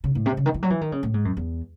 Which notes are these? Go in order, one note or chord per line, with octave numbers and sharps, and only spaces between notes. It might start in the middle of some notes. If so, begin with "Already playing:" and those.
C#3
A2
C3
C#3
D#3
E3
F#3
E3
D#3
C#3
A2
G#2
F#2
E2